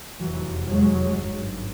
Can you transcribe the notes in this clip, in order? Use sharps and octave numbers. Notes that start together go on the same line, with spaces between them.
F1 E2 C3 E3 F#3
F#3 G#3
G#1 G2